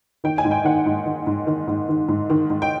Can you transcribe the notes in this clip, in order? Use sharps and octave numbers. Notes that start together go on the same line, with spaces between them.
D#3 G5
G#5
G#2
G5
D#3 F#5
G#2
D#3
G#2
D#3
G#2
D#3
G#2
D#3
G#2
G5